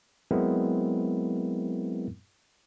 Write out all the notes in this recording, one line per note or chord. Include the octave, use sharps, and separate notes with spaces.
F#3 G#3 B3 C4 E4 A#4